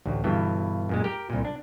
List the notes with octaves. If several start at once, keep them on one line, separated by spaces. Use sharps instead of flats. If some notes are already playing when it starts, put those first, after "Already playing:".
A1 D2
G1 G2 B2 E3
F#2 A#2 G#3
G4 A#4 G5
C2 A#2
D4